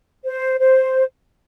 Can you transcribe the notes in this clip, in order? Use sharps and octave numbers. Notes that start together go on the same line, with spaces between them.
C5
C5